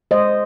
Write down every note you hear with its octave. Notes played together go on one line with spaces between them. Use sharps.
G#3 C5 D#5